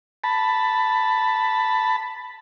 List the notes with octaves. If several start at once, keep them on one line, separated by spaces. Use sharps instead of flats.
A5 B5